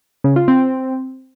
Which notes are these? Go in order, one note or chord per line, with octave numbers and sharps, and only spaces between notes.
C#3
F4
C4